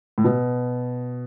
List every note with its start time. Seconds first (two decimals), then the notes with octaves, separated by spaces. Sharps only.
0.18 A2
0.24 B2